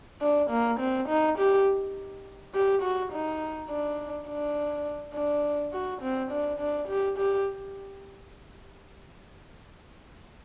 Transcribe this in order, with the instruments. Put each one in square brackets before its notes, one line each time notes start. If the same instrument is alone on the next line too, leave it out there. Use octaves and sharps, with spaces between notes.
[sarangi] D4
A#3
C4
D#4
G4
G4
F#4
D#4
D4
D4
D4
F#4
C4
D4
D4
G4
G4